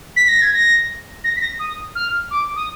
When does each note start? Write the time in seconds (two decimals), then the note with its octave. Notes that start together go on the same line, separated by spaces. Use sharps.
0.17 B6
0.28 A#6
0.42 G#6
0.53 A#6
1.24 A#6
1.36 B6
1.41 A#6
1.59 D#6
1.95 F6
2.31 D6
2.56 D#6